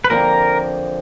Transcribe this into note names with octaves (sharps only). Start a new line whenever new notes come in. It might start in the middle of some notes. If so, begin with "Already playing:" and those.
B4
F2 D3 F3 A#3 A#4